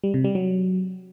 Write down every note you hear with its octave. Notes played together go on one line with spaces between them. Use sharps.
G3
C3
G3
F#3